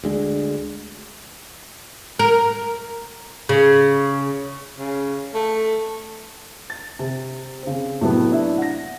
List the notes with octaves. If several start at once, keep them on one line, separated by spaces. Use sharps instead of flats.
D2 G#3 D4
A#4
C#3
C#3
A3
A6
C3
C#3 C4
A2 C3 F#3 A3 B3
D4 E4 D5 E5
F#5 A#6